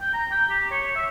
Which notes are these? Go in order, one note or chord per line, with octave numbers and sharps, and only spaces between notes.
G5
A#5
G5
G4
C#5
E5